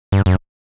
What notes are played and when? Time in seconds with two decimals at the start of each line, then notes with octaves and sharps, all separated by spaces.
0.12 G2
0.26 F#2